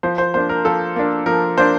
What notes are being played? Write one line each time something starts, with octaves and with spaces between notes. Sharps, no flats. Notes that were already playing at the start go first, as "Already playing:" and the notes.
F3 C5
C5
A#3 D4 C5
A#4
F3 A4
A#3 D4
F3 A#4
A#3 D4 C5